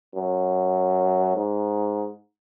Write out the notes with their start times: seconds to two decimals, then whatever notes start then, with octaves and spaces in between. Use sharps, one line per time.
0.15 F#2
1.36 G#2